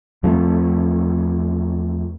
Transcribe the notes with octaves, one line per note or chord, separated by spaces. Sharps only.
E2 F3 A3 C4